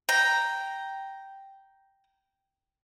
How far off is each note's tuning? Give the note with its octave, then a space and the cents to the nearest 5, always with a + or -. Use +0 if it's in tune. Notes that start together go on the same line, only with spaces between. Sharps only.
G5 -5 A#5 +0